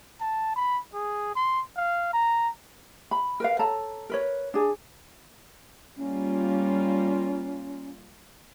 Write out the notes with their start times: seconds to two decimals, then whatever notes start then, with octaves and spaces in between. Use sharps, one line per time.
0.21 A5
0.56 B5
0.94 G#4
1.36 C6
1.77 F5
2.13 A#5
3.11 B5
3.40 A#4 B4 F5
3.59 A4 C#5 A5 A#5
4.10 A#4 B4 C#5
4.54 D4 G#4
5.97 G3 A#3 C#4 F4